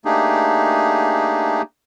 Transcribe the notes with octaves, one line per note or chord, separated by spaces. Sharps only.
A3 A#3 D4 D#4 G4 G#4